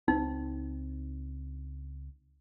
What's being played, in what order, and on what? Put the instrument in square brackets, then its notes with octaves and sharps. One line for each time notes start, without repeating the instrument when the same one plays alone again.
[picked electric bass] C#2 C4 [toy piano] D#4